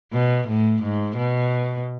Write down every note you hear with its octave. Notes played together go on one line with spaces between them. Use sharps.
B2
A2
G#2
B2